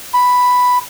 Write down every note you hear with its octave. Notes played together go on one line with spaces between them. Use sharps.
B5